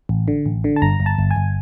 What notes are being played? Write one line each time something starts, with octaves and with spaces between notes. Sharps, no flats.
A1
D3
A1
D3
A5
G1 A#5
G1
A5
G1
G#5
G1